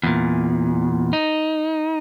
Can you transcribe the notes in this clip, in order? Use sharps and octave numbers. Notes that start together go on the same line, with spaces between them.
E2 A#2
D#4